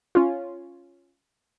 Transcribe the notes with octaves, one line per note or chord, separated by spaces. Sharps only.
C#4 F4